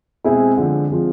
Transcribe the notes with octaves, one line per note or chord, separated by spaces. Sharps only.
B2 G#3 C4 E4 G#4
D3 F3 G#3 C4
F3 G#3 C4 F4